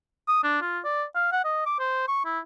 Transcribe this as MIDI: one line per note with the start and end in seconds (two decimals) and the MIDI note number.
0.28 0.41 87
0.44 0.62 62
0.62 0.79 65
0.85 1.04 74
1.16 1.31 77
1.32 1.43 78
1.44 1.62 75
1.66 1.76 86
1.79 2.05 72
2.08 2.20 85
2.25 2.39 64